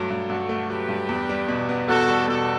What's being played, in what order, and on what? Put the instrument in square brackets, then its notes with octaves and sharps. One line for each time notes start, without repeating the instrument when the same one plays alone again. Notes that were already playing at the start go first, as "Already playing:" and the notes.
Already playing: [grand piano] G2 F#3 A3
G2
[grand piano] G2 [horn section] F#4 A4
[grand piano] A3
[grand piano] F#3 [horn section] G4 B4
[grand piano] G2
E2
G3
B2
B3
[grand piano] E2 [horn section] F#4 A4
[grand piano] G3
[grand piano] B2 [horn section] F#4 A4